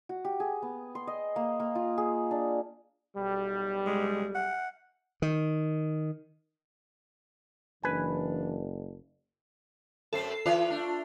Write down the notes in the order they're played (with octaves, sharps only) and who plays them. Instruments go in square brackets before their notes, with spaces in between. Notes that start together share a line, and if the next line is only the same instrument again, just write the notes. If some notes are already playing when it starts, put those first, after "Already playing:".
[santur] F#4
G4
G#4
B3
C6
D#5
A#3
A#3
F4
G#4
D4
[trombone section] B1 G3
[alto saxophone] G#3
F#5
[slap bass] D#3
[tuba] F#1 [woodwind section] E3 D4 [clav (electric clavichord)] B4 G#5
[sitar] F#2 A3 C4 [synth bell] A4 C7
[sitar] E3 B4 D5 [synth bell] F4
[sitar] A3 D4